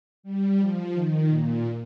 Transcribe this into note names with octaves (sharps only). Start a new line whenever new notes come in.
G3
F3
D#3
A#2